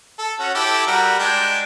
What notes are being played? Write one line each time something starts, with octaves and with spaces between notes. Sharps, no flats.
A4
C#4 F#4
E4 G4 A4
G3 F#4 A#4
G#3 D4 G5